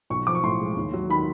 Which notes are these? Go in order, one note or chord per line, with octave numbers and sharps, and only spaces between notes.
B1 C#6
F3 D6
C#6
A2 C6
G#3
D#2
F#3
D#3 B5